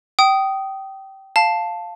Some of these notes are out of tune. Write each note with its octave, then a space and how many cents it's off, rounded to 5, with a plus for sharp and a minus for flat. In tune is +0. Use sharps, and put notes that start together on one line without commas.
G5 -20 D#6 +0
F5 +0 A5 +0